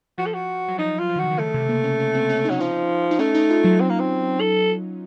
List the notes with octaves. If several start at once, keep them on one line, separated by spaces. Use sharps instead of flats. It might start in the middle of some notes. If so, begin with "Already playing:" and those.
F3 F#4
A4
F#4
F#3
F3 D#4
F4
F3
D#3
C#3 F#4
D#3
C#3 A3
C3
A#3
C#4
C#4
C4
C#4
D#4
F#3 C#4
F3 D#4
D#4
A3 C#4
D#4
F4
F#3
C4
A#3
C4
A4